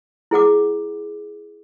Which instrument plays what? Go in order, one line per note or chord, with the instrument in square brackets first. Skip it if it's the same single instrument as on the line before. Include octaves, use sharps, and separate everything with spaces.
[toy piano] E4 G#4 F#5 D6